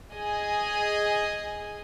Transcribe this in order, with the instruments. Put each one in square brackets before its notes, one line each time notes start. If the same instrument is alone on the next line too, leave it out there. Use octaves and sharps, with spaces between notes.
[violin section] G#4 D#5 G#5